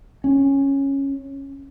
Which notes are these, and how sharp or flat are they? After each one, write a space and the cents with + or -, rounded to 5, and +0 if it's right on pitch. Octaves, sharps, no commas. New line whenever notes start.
C#4 -10